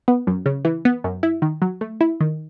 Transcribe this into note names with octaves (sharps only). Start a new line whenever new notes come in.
B3
F#2
C#3
E3
B3
F#2
E4
D#3
F#3
A3
E4
D#3